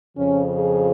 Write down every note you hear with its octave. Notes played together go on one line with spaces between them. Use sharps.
F2 C#3 F3 C#4
G#4